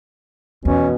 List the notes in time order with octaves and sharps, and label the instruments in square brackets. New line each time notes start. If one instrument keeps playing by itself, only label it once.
[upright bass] E2 [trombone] B2 [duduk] C#4